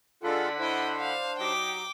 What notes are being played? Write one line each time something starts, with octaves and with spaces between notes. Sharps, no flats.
D3 G#3 D4 F4 A4 F#5 B5
D4 E4 C5 D#5
F5
F#3 D#4 G4 G5 D6